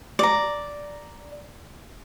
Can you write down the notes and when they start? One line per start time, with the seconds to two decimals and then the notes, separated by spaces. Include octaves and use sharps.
0.19 D5 A#5